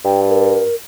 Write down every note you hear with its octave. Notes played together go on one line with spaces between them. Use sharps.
G2 G5
A#4